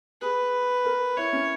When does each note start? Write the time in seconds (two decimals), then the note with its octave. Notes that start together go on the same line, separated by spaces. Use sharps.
0.21 G#4 B4
0.85 A#4
1.17 E4 C#5
1.33 C#4